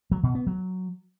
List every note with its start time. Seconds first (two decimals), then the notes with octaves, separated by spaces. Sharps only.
0.11 F#3
0.23 B2
0.35 B3
0.47 F#3